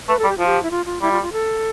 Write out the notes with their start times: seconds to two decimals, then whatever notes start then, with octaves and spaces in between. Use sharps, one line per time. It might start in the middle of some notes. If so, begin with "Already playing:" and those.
0.08 A3 B4
0.19 G3 A4
0.29 G4
0.38 F3 F4
0.46 G4
0.63 E4
0.71 F4
0.86 F4
1.01 G3 E4
1.12 F4
1.22 F4
1.33 A4